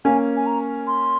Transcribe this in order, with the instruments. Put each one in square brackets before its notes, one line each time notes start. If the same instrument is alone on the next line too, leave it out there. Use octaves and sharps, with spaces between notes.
[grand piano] A#3 C#4 [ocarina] G#5
[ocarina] G#5
A#5
C6